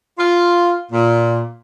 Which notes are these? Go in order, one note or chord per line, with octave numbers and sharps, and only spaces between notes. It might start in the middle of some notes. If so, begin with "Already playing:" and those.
F4
A#2